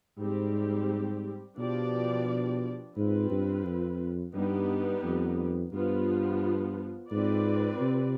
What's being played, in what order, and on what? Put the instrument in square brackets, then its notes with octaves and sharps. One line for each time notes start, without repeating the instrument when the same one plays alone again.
[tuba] G#2 [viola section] G3 C4 G4
[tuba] B2 [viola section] F3 B3 D4 G4 D5
[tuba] G#2 [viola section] C4 F4 B4
[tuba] G2
F2
[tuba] G2 [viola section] G3 B3 D#4 G4
[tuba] F2
[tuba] G2 [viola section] F3 B3 F4
[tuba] G#2 [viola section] C4 F4 B4 D5
[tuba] C3